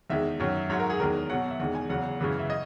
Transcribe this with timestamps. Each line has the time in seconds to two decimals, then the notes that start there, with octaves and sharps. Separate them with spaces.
0.10 E2 D#3 G#3 E5
0.40 F#2 D#3 F#3
0.70 G#2 F#3 C#5
0.80 A#4
0.90 G#4
1.00 E2 D#3 G#3 A#4
1.30 B2 F#3 F#5
1.51 E5
1.60 E2 D#3 G#3 F#5
1.75 G#5
1.90 E2 C#3 F#3 F#5
2.20 F#2 C#3 E3 G#3
2.39 E5
2.50 D#5